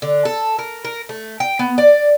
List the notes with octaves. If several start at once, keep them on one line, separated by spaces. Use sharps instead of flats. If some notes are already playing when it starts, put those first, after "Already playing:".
D3
A4
A#4
A#4
A3
G5
B3
D5